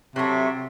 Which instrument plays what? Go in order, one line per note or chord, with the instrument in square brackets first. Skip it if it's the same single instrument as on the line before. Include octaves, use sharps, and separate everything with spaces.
[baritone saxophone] C3 [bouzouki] F#3 A3